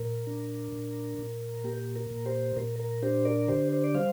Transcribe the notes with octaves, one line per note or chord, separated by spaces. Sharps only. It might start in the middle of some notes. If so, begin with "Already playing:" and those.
Already playing: A#2 A#4
D4
A#2
A#2
A#3 G4
A#4
A#2
G4 C5
A#2 A#4
A#4
D4 G4 C5
A#4 D5
D3 G4 C5
C5
D5
G3 C5 F5